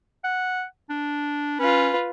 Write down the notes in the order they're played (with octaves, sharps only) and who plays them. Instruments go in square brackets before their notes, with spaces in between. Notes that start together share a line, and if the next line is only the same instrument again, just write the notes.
[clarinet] F#5
D4
[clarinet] C#4 [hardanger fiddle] F4 B4